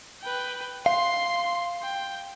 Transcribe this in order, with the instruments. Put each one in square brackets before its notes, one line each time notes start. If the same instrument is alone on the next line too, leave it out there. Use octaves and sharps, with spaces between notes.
[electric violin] B4 G5
[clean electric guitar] F5 [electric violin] C6 C7
[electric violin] G5